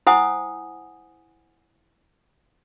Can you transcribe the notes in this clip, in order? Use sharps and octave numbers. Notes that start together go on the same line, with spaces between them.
E4 C5 F#5 G#5 D#6